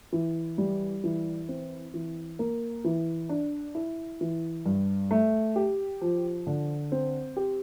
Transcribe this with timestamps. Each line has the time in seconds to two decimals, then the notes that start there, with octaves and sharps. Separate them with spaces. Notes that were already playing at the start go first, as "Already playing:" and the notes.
0.13 E3
0.58 G3
1.04 E3
1.49 C4
1.94 E3
2.39 A#3
2.85 E3
3.29 D4
3.75 E4
4.21 E3
4.66 G2
5.11 A3
5.56 G4
6.01 F3
6.47 D3
6.92 C4
7.36 G4